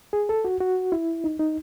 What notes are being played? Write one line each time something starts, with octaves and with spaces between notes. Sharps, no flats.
G#4
A4
F#4
F#4
E4
D#4
D#4